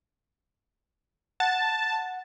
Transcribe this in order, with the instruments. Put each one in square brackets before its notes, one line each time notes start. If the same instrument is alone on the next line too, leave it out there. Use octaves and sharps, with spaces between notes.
[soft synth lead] F#5 [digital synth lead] A5